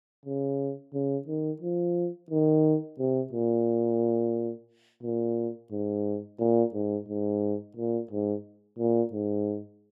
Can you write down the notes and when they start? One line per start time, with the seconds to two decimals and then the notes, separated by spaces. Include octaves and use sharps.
0.25 C#3
0.94 C#3
1.28 D#3
1.62 F3
2.30 D#3
2.99 C3
3.33 A#2
5.03 A#2
5.72 G#2
6.40 A#2
6.74 G#2
7.08 G#2
7.76 A#2
8.11 G#2
8.79 A#2
9.13 G#2